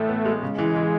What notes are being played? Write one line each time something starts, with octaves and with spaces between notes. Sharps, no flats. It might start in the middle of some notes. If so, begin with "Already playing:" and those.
Already playing: A1 A2 A3
B3
G#3
C#3 G#3
E3
E3